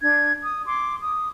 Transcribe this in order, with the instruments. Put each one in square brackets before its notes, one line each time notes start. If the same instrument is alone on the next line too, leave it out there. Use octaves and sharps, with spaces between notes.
[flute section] D4 G#6
D#6
C6 D6
D#6